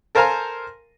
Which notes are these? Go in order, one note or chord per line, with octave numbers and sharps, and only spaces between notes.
A4 A#4 C5 F5 G#5 A#5